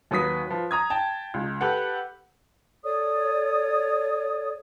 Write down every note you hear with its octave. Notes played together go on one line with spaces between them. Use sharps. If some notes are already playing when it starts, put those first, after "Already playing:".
D#2 F#3 B4 D#6 B6
F3 B4
A#5 D#6 G#6
G5 A5
C#2
G4 A4 B4 F#5
A4 C#5 D5 D#6